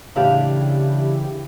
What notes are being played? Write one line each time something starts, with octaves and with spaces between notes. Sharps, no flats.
A2 C#3 E3 D4 E4 G4 F5